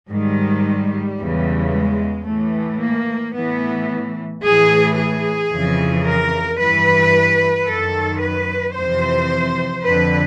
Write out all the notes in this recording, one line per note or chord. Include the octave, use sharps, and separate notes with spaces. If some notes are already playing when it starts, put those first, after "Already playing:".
G#2 D#3 G3
E2 C#3 E3
G#3
A2 E3 A3
A#3
A2 E3 B3
A2 E3 G#4
G#4
F2 C#3 E3
A#4
G2 E3 B4
F#2 D#3 A4
B4
F2 C3 E3 C5
F2 D3 B4